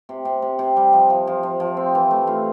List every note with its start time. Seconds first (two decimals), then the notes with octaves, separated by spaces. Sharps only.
0.09 C3
0.25 C3
0.42 C3
0.59 C3
0.76 G3
0.93 F3
1.10 F3
1.27 F3
1.43 F3
1.60 F3
1.77 C4
1.95 E3
2.11 A3
2.27 F4